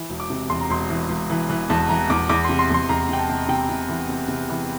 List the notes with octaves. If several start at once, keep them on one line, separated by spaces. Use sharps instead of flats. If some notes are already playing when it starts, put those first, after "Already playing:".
Already playing: E3
E1
D6
C3
E2 C6
A#5
E1 C6
E3
E1
E3
E3
E2 A5
E3 A#5
E2 D6
E2 D6
C6
C3
C6
E2 C6
E2 A#5
C3 G5
A5
C3
C3 G5
C3
E3
C3
C3
E3